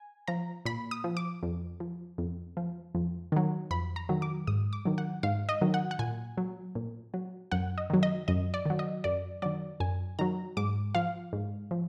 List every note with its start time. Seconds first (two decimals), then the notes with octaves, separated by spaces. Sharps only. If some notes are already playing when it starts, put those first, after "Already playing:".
Already playing: G#5
0.28 F3 A#5
0.65 A#2 B5
0.91 D#6
1.04 F3
1.17 D6
1.43 F2
1.80 F3
2.18 F2
2.57 F3
2.95 F2
3.32 D#3 F#3
3.71 F2 B5
3.96 A#5
4.09 D#3 F#3
4.22 D6
4.47 G#2 D#6
4.73 D6
4.85 D#3 F#3
4.98 F#5
5.23 G#2 F5
5.49 D#5
5.61 D#3 F#3
5.74 F#5
5.91 F#5
5.99 A#2 G#5
6.37 F#3
6.75 A#2
7.14 F#3
7.51 F#2 F#5
7.78 D#5
7.90 D#3 F#3
8.03 D#5
8.28 F#2 D#5
8.54 D5
8.66 D#3 F#3
8.79 D#5
9.04 F#2 D5
9.42 D#3 F#3 D5
9.80 F#2 G#5
10.19 D#3 F#3 A#5
10.57 G#2 D6
10.95 F3 F5
11.33 G#2
11.71 F3